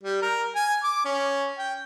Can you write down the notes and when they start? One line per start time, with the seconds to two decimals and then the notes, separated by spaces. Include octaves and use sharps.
0.03 G3
0.22 A#4
0.55 G#5
0.83 D6
1.05 C#4
1.58 G5